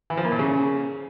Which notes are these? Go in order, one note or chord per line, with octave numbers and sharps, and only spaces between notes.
E3
F3
A#3
A#2
C#3